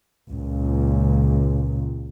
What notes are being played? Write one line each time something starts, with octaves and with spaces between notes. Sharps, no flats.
C#2 A#2